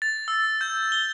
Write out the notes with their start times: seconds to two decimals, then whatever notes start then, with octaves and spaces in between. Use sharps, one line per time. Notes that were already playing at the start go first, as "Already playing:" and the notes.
0.02 A6
0.28 E6
0.61 G6
0.92 G7